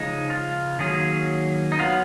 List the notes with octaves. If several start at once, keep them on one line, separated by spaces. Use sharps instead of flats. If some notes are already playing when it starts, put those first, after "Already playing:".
Already playing: C#3 F3 G#3 D#4
F4
D#3 F#3 A#3 C#4 G#4
D#4
F#3 B3 F4